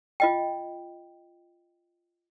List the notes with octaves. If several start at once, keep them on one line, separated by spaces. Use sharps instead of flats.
F4 D#5 G5